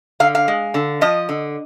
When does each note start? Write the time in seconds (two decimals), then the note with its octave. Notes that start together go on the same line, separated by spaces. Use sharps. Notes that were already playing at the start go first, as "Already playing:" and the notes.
0.20 D3 F5
0.35 F5
0.48 G#3
0.74 D3
1.01 F3 D#5
1.29 D3